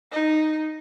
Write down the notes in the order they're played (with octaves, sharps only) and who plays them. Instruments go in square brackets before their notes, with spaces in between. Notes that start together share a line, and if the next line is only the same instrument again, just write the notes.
[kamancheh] D#4